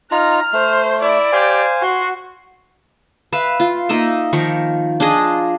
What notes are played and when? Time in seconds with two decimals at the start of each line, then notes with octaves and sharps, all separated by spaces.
0.11 D#4 F4 A#5 F6
0.53 A3 C5
1.02 E4 D5
1.32 G4 C5 F5 G#5
1.82 F#4 C6
3.32 B4 E5 F5
3.60 F4
3.89 A#3 D#4 D#5 E5
4.33 D#3 F3 A#4 C#6
5.00 D4 F4 G#4 D#5